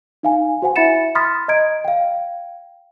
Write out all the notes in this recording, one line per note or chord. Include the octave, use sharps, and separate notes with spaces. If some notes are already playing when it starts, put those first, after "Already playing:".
D#4 F5 G#5
F#4 C5 F#5 G#5
E4 E5 B5 A6 C#7 E7
B5 C6 D#6 F6 A6 B6
D#5 A#5 G#6 D7
F5 G5